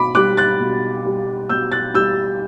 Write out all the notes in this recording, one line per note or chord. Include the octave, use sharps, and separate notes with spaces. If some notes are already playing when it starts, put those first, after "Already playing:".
Already playing: B2 B5 D6
G3 D6 F#6
F#6 A6
B2
G3
B2 E6 G6
F#6 A6
G3 E6 G6